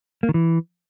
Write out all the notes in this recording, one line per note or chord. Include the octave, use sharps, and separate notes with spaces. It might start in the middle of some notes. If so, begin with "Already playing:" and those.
A#3
D#3
E3